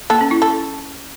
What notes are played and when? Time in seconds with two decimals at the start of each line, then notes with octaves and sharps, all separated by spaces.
0.10 A#3 A4
0.21 C#4
0.31 E4
0.42 A4